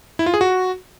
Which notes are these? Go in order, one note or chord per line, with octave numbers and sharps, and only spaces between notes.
E4
F4
G#4
F#4